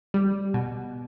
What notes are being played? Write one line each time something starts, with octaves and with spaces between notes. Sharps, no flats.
G3
B2